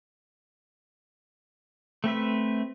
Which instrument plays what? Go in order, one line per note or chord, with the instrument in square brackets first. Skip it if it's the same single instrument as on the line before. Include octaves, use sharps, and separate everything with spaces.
[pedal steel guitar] A3 C4 B4 E5